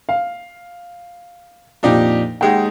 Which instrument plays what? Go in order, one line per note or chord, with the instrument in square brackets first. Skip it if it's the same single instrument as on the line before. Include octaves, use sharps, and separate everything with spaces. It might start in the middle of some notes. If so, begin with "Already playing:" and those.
[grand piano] F5
[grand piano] F2 A#2 [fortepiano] D4 D#4 G4
[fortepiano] D#2 G#3 D#4 [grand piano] F#5 G5